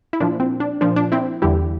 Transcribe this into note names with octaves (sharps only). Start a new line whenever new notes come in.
E4
A#2 F3 D4
C4
D4
A#2 F3 D4
D4
C4 E4
E2 D3 G3 E4 G4